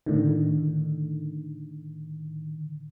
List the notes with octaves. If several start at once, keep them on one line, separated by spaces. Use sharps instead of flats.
A2 D3 D#3